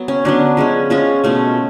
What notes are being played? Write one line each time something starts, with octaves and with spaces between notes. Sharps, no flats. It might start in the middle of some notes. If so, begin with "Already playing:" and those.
Already playing: F#3 B3
C#4
D3 F#3 B3 D4
F3 G#3 C#4
F3 G#3 C#4 F4
B2 A3 C#4